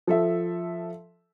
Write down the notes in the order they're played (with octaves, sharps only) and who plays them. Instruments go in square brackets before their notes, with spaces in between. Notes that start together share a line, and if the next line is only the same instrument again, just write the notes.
[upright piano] F3 A4 E5